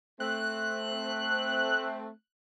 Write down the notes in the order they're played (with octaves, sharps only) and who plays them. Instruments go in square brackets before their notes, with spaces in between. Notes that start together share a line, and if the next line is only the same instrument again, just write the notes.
[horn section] A3 C4 [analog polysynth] F#6